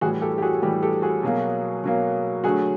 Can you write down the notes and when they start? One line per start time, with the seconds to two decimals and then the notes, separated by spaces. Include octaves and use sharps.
0.01 A2 E3 G3 F#4 G#4
0.22 G4 A4
0.38 G4
0.42 F#4 G#4
0.62 A2 E3 G3 G4
0.83 G4 A4
1.02 F#4 G#4
1.23 B2 F#3 A#3
1.84 B2 F#3 A#3
2.44 D3 F#3 A3 F#4 G#4